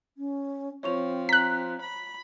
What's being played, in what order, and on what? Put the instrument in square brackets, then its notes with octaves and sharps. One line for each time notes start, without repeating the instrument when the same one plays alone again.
[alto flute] C#4
[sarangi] F3 [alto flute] C4 [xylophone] C#5 C#6 F7
[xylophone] A#5 [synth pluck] F#6 B6
[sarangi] B5